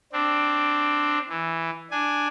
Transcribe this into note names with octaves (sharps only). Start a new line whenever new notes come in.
C4 D4
E3
D4 G#5